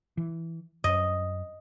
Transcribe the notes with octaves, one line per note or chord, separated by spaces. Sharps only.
E3
F#2 D#5